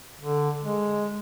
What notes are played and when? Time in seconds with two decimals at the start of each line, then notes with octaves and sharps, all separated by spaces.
0.19 D3
0.63 G#3